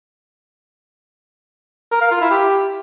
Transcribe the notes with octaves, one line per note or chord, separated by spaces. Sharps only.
A#4
F5
F4
E4
G4